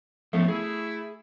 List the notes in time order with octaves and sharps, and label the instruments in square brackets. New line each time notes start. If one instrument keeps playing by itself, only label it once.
[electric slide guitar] F3 B3 C#4 [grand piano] A3
[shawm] E4 [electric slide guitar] G#4